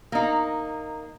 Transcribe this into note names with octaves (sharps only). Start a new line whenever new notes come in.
A#3 D#4